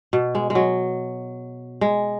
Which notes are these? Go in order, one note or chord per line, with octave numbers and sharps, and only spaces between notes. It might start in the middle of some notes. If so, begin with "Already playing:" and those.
B2
G#3
G#3
F#3
G#3